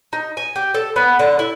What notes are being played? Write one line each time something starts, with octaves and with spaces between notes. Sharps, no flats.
D#4
G#5
G4
A4
B3
D3
E4